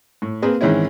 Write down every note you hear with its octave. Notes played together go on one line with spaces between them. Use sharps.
A2
A#3 C4 G#4 B4
G#2 D#3 E3 C4 C#4 E4